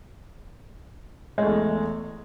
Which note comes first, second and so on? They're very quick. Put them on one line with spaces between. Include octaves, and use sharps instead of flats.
G#3 A3 E2